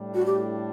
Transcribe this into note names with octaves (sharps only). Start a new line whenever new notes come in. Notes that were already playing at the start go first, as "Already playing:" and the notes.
Already playing: A2 G3 D4
F#4
G4